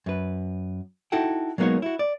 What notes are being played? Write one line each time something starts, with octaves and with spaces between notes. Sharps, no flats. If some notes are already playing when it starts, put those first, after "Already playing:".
F#2 B4
D#4 E4 F#4 A4 F#5 G5
F#3 G#3 A#3 B3 D#4 C#5
E4 F#4
D5